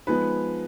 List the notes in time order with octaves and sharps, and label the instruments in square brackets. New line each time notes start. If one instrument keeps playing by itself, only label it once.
[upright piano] F3 G#3 B3 D#4 B4